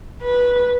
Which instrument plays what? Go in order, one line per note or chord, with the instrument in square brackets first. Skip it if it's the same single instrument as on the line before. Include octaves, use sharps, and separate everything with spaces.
[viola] B4